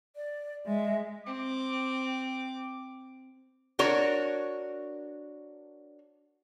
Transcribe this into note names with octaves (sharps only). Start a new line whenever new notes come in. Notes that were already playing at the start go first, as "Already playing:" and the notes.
D5
G#3 E5
C4 D6
D4 F#4 A#4 C#5